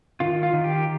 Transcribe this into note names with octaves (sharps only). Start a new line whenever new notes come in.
D#3 F4
F4
D#3
G4